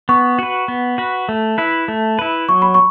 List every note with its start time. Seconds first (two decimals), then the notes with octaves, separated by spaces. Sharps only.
0.09 B3 C#6
0.39 F#4 B4
0.68 B3
0.98 F#4 B4
1.29 A3
1.58 E4 B4
1.88 A3
2.19 E4 B4
2.49 F#3 C#6
2.62 B5
2.74 C#6